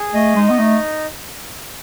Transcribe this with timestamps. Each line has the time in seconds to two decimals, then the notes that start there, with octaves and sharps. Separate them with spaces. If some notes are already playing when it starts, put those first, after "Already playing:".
Already playing: G#4
0.14 A3 D#5
0.36 G#3 D#4
0.50 B3
0.58 A3 D#4